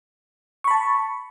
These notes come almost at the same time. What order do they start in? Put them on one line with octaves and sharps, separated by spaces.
C#6 B5 A5